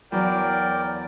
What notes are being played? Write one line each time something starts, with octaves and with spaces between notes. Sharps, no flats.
E2 F#3 A#4 D5 G5